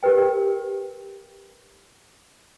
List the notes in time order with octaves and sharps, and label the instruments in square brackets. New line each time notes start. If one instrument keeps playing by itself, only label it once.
[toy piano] G4 A#4 B4 G5